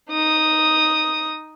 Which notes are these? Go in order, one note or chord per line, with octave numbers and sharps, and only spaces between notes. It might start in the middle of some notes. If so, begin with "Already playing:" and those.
D#4 D#6